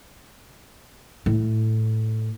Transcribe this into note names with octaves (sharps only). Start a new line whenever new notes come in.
A2